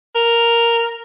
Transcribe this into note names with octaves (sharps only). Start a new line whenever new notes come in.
A#4